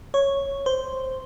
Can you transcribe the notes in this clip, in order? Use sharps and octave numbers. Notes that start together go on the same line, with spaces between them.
C#5
C5